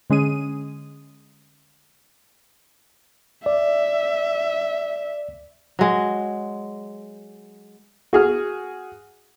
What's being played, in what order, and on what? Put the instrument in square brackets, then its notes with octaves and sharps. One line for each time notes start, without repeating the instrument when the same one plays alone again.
[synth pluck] D3 G#3 C#4 G#4 D#7
[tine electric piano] D5 [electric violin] E5
[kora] F#3 G#3
[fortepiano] F#4 G#4 F6